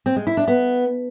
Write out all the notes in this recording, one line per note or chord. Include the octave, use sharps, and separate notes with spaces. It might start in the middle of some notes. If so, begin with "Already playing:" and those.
C4
G#3
E4
D4
B3